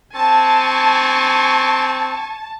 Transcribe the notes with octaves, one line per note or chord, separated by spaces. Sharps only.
C4 G#5 A5 C#6